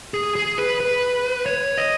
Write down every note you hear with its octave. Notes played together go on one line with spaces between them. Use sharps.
G#4
G#4
B4
B4
C#5
D#5